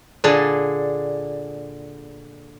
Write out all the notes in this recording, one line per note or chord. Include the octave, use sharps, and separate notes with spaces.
A#2 D3 D4 G#4